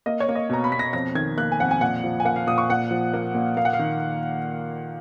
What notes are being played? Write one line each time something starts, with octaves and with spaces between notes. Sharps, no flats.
A#3 D#5
C#5
A#3
D#5
B2 A#5
B5
B2 B6
A#6
F2 A#6
D#3 G#6
A#3 F#6
G#5
F2 F#5
G#5
A#2 F#5
F3
G#5
A#3 F#5
F5
A#2 D#6
C#6
A#2 F#5
F3
A#3
A#2
A#3 F5
F#5
F5
D#3